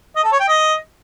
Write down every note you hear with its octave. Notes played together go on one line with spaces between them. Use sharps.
D#5
A4
C#5
G5
D#5